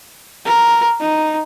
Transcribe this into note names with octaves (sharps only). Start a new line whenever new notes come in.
A#4
D#4